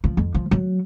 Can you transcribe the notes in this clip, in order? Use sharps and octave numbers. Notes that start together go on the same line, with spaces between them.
F3
F2
F3
F#3